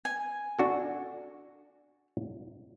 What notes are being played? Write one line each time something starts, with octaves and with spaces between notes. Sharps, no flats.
G#5
D4 F#4 A4